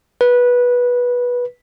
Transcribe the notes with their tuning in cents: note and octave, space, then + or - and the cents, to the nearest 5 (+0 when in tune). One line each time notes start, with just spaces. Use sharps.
B4 -15